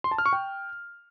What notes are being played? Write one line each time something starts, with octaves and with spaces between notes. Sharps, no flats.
C6
A5
F6
C#6
G5